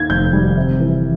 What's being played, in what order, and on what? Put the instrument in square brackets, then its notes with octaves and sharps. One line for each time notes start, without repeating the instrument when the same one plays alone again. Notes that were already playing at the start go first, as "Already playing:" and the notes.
Already playing: [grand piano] D#2 D#3 G#6
F1 G6
G3
C3
E3